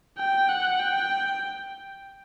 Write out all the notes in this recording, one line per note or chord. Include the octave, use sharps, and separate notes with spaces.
G5
F#5
G5